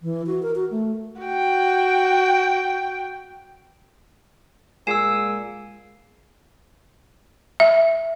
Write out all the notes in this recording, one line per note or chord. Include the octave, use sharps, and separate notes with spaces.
E3
F#4
A#4
F#4
A3
F#4 G5
A#2 G#3 G#4 G#5 E6 C7 E7
E5